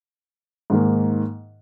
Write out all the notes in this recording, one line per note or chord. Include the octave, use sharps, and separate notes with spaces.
G#2 D#3 A#3